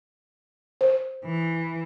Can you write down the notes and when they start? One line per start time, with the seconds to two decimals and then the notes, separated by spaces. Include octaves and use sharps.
0.81 C5
1.26 E3